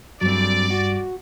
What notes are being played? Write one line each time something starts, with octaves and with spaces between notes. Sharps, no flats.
G2 F#3 C4 D5
F#4